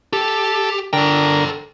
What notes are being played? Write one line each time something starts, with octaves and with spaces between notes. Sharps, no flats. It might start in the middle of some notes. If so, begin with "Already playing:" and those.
G4 A4
D3 A4 A#4 G5